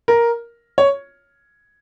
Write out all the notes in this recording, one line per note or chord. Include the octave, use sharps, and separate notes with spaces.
A#4
C#5